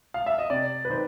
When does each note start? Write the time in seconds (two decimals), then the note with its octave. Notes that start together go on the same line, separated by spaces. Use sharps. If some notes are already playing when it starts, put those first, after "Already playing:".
0.14 F5
0.26 E5
0.38 D#5
0.50 C3 D5
0.85 B4
0.90 D#3 C5